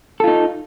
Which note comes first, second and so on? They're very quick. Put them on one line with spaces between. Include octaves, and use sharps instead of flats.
A4 F4 D#4